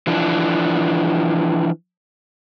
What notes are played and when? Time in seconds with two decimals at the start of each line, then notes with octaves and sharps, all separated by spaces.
0.07 E3 F3 D4